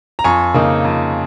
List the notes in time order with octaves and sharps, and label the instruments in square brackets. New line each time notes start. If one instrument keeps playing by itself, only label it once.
[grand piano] A#5
F2 G#5 C#6
C#3 A#3 D#4
F2